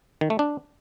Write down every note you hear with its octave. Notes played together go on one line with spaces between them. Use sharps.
D#3
A3
D4